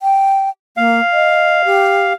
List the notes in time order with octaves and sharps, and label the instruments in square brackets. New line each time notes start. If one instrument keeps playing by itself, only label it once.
[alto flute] G5
[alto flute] A#3 [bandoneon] F5
[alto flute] D#5
G4